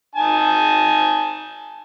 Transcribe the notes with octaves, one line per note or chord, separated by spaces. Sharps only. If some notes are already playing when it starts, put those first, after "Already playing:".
D#4 G#5 A5